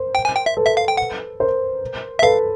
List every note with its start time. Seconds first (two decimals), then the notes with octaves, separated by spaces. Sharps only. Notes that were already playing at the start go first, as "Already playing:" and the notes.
Already playing: A#4 C5
0.15 G5
0.25 G#5
0.36 G5
0.46 E5
0.57 A4 B4
0.66 E5
0.77 F5
0.88 G5
0.97 F#5
1.40 A#4 C5
2.19 E5
2.22 A4 B4 F5